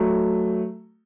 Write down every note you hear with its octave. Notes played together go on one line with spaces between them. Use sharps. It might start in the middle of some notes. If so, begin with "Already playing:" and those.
Already playing: F#3 A3